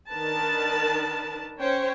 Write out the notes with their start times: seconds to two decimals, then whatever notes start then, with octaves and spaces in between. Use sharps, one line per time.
0.10 D#3 D4 A#4 B4 A5
1.60 C#4 C5 C#5 G5